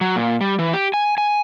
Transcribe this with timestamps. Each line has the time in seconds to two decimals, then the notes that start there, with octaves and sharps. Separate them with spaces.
0.01 F#3
0.16 A#2
0.41 G3
0.59 E3
0.73 G4
0.94 G#5
1.18 G#5